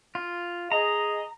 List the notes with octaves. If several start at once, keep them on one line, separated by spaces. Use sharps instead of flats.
F4
G#4 D#5 A#5